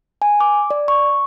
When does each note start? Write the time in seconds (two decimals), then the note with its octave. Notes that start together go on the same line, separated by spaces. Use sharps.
0.22 G#5
0.41 D6
0.71 D5
0.88 C#6